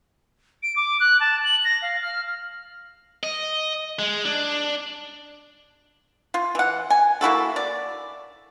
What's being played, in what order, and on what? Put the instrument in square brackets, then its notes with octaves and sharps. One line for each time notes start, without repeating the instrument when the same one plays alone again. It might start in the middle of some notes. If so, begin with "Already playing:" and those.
[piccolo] D7
D6
F#6
A5
F#7
A#6
F5
F6
[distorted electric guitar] D#5
G#3
D4
[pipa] F4
E3 F#5
G#5
A#3 E4 F#4 A4
D5